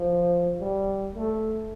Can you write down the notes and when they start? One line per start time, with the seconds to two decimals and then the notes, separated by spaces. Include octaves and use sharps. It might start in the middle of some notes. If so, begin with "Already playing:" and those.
Already playing: F3
0.60 G3
1.15 A3